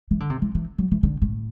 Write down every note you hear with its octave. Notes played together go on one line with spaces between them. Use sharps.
E3
D3
C3
E3
E3
F#3
E3
D3
A2